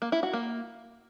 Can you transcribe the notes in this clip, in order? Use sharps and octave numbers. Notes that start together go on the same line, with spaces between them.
A#3
E4
F#4
A#3